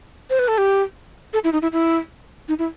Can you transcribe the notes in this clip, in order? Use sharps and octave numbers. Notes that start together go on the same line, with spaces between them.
C5
B4
A4
G4
A4
E4
D#4
E4
E4
D#4
E4